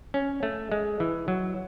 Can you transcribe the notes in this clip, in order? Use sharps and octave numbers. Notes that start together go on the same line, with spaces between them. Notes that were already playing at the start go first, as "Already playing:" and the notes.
C#4
A3
G#3
E3
F#3